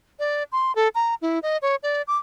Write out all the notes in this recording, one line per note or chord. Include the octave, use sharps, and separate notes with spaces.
D5
C6
A4
A#5
E4
D#5
C#5
D5
D6